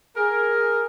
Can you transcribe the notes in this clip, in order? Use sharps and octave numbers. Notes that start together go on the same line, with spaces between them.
G#4 A#4